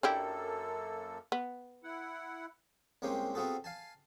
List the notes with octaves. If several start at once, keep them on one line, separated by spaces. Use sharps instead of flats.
F#2 A#3 D4 E4 G4 A4
B3
E4 F#5
C2 G#3 A#3 C4 C#4 G4
B3 C4 F4 F#4 G#4 A4
F5 G#5 A5